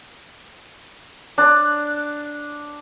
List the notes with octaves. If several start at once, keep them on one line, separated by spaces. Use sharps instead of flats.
D4